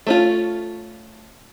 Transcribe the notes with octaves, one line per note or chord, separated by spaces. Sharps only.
A3 C#4 F4